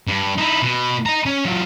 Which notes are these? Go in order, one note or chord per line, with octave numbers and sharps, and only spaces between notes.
G2
D#4 E4
B2
D#5 A#5
C#4
F#3 F4